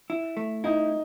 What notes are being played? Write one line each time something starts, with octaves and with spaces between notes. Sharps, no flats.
E4
A3
D#4 E4